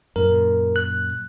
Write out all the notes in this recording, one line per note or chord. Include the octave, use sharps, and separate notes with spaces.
F#2 A#2 A#4
F#6